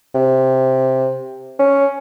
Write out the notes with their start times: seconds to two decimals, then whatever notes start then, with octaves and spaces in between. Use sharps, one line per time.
0.15 C3
1.59 C#4